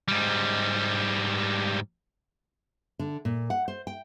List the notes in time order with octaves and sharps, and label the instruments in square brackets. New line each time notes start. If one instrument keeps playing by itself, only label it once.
[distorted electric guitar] G#2 G3
[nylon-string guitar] D3
A#2
F#5
C5
G5